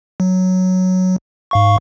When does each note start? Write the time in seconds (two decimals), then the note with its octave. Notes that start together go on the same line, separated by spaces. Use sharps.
0.20 F#3
1.51 G#2 F5 C#6